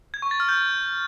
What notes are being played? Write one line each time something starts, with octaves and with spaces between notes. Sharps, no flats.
G#6
C#6
A6
F6
G6